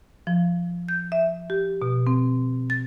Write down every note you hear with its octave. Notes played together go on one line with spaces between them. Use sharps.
F3
G6
E5
G4
B2
C4
A6